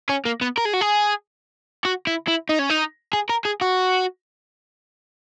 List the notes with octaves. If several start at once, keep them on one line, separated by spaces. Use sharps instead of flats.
C#4
A#3
B3
A#4
G#4
F#4
G#4
F#4
E4
E4
D#4
C#4
D#4
G#4
A#4
G#4
F#4